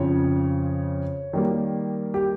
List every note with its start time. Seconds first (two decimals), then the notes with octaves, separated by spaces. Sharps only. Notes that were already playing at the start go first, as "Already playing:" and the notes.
Already playing: F2 C#3 F3 C#5
1.33 D#3 G3 A#3
2.14 G4